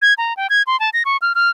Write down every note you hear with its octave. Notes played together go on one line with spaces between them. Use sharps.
G#6
A#5
G5
G#6
C6
A5
A#6
C#6
F6
F6